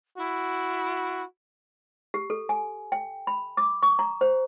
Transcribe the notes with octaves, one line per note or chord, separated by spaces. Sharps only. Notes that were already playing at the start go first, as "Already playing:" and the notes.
E4 F#4
G4
A4
G#5
G5
B5
D6
C#6
A#5
C5